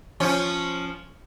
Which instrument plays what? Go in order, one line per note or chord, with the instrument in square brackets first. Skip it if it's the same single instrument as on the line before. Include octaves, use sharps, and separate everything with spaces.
[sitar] F3 C#4